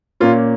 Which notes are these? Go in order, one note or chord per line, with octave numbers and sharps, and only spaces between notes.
A#2 A#3 C#4 F4